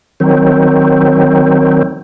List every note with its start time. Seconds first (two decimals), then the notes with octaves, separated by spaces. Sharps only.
0.20 D#3 F#3 C4